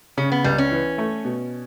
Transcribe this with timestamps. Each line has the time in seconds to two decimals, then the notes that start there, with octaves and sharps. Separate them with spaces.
0.17 C#3 C#4
0.32 B3
0.44 C#2 G3
0.58 C#4
0.71 E3
0.98 A3
1.25 B2